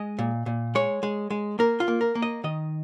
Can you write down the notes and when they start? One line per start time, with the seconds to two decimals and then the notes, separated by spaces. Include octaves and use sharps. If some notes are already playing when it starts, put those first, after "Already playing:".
Already playing: G#3 D#5
0.19 A#2
0.46 A#2
0.75 G#3 C#5
1.03 G#3
1.30 G#3
1.59 A#3 A#4
1.80 F4
1.88 A#3
2.01 A#4
2.15 A#3
2.22 D#5
2.44 D#3 D#5